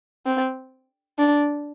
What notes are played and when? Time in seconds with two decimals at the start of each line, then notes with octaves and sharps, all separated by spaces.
0.26 C4
1.19 D4